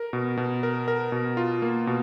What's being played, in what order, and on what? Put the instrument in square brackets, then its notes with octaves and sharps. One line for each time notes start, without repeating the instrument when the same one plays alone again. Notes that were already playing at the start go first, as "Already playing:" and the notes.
Already playing: [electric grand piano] A#4
B2
B2
A#4
A#4
B2
F4
A#3
B2